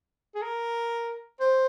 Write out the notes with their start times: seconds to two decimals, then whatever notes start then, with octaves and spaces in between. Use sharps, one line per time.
0.35 G#4
0.42 A#4
1.40 C5